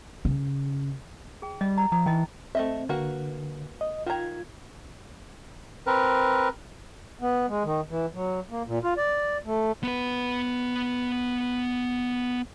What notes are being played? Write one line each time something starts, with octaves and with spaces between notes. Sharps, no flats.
C#3
G#4 G5
G3 D#5
A#5
F3 A#5
E3 D#4 D#5 G5
A3 C4 D#5 E5
D3 A#3 F#4 B4
D#5
D#3 F4 A#5 G#6
C4 A#4 B4
B3
G#3
D#3
E3
F#3
A#3
A#2
F4
D5
A3
B3 B4